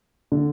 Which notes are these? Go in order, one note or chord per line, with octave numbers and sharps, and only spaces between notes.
D3